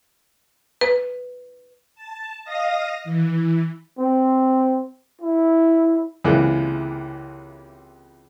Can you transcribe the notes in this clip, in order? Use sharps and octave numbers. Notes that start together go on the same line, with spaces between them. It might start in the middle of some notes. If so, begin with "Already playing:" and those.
B4
A5
D#5 F5 D#6 A#6
E3
C4
E4
C#2 C3 E3 G#3 A#3